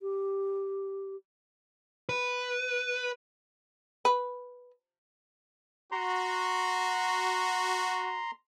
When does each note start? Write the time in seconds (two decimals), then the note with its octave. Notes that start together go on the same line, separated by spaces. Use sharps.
0.02 G4
2.09 B4
4.05 B4
5.92 F#4 A#5 C6